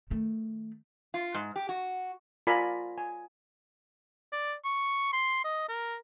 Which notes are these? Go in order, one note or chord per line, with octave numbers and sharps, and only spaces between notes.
D#3 A3
F4
G#2
G4
F#4
F4 A#4 D5 G#5 A#5 B5
G#5
D5
C#6
C6
D#5
A#4